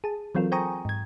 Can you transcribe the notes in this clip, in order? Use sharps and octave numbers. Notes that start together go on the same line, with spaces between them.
G#4 A5
E3 F#3 C4 F4 A4 A#4
C5 G5 G#5 A#5 C#6 D#6
G#2 G#6